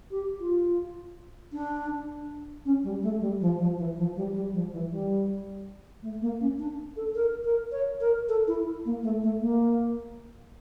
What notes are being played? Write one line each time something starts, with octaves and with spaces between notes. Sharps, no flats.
G4
F4
D4
C#4
G3
A3
G3
F3
F3
E3
F3
G3
G3
F3
E3
G3
A3
A#3
C#4
D4
A4
A#4
A#4
C#5
A#4
A4
E4
A#3
A3
A3
A#3